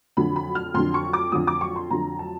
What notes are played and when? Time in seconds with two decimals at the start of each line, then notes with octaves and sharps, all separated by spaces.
0.17 F2 D3 F#3 B5
0.36 B5
0.55 F6
0.74 F2 D3 F#3 C6
0.94 C#6
1.13 D6
1.32 F2 D3 F#3 D#6
1.47 D6
1.61 C#6
1.76 C6
1.90 F2 D3 F#3 A#5
2.19 A5